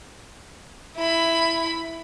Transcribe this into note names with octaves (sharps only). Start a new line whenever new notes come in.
E4 B5